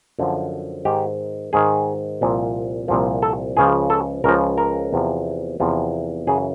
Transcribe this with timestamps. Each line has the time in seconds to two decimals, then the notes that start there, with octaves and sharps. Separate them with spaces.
0.19 F#2 D3 F3
0.85 G#2 D#3 G4
1.53 G#2 D#3 G#4
2.21 C2 A#2 F3
2.88 C2 A#2 F3
3.22 A4
3.57 C#2 C#3 F3 G#4
3.90 A4
4.24 C#2 C#3 F3 A#4
4.58 A#4
4.93 E2 C3 F3
5.60 E2 C3 F3
6.27 F#2 C#3 E3 G#4